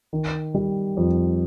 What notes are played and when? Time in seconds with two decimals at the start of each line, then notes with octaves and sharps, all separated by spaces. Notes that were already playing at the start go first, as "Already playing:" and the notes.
0.13 D#3
0.54 G3
0.97 F2